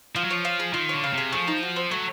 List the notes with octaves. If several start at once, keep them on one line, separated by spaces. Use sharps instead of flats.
F3 F4
F#3
F3 C#5
F5
G#4
D#3 F4
D3 C#5
C#3 F5
C3 G#4
F3 A3
D#4
F#4
C4
F#3 A3